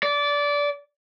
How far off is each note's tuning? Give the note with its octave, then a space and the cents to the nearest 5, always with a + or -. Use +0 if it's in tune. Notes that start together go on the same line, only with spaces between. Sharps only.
D5 -20